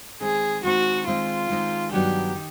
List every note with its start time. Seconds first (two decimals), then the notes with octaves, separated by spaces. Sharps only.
0.21 D#3 G#3 C4 D#4 G#4
0.64 D#3 G#3 C4 D#4 F#4
1.06 D#3 G#3 C4 D#4 F4
1.50 D#3 G#3 C4 D#4
1.91 G2 D#3 F#3 B3 D4 G4
2.35 D#3